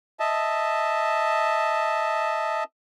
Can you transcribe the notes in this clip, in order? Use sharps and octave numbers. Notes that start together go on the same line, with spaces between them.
D#5 E5 A5